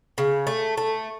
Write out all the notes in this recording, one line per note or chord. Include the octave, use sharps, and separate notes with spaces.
C#3
A3
A3